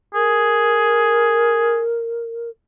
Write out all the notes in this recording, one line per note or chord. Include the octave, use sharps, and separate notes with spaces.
G#4 A#4